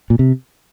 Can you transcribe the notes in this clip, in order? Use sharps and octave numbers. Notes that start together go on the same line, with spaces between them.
A#2
C3